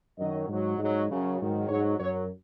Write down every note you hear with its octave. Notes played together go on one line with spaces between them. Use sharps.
F#2 D#3 F#3 D#5
G#2 F#3
G#2 F#3 D#5
F#2 C#3 F#3
G#2 D#3 F#3
G#2 F#3 C#5
F#2 F#3 C#5